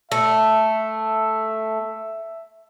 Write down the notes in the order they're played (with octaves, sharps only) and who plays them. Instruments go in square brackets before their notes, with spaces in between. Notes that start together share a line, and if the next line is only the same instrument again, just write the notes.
[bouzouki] A3 [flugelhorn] E5